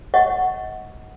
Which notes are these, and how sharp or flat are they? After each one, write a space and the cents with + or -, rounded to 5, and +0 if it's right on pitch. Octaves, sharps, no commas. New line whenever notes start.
D#5 +30 F#5 +0 C#6 +0